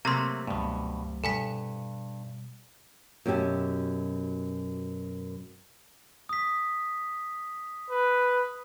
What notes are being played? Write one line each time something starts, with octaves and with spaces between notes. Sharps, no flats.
C3 F#3 A3 A#3 A#5 C6
C#2 G2 B2 F#3 A3
G2 B2 G3 A4 G#5 B6
F#2 B2 G4 E5 A5
D#6 B6
B4